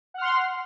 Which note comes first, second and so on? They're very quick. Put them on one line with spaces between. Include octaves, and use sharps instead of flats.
F#5 F6 C6